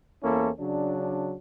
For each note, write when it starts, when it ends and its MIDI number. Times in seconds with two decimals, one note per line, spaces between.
0.22 0.49 40
0.22 0.49 58
0.22 0.49 61
0.22 0.49 64
0.22 0.49 69
0.59 1.34 49
0.59 1.34 54
0.59 1.34 62